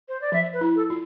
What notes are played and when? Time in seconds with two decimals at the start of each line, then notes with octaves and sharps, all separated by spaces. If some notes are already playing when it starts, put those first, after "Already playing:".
0.09 C5
0.21 D5
0.32 F3 E5
0.53 B4
0.61 E4
0.76 A4
0.90 F4